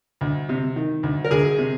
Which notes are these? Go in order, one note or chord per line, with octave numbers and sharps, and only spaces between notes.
D2
C3
D#3
D2
A#4
D2 G#4
C3